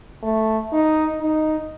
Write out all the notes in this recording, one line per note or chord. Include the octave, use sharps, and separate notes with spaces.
A3
D#4
D#4